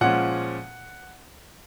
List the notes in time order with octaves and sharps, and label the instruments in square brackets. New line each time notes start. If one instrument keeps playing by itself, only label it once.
[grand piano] A#2 F3 G#3 C#4 F#5